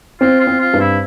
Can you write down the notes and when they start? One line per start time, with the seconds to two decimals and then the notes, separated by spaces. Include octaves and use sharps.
0.21 C4 F4
0.40 F4
0.47 C4
0.60 F4
0.74 G2
0.80 E4